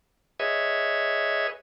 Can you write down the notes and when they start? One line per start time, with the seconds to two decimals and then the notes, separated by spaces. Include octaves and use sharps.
0.40 G#4 B4 C#5 D#5 E5